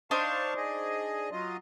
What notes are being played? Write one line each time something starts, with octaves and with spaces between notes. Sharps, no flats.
D4 D#4 C5 F5 A5 C#6
G#4 D#5
F#3 F4 D#5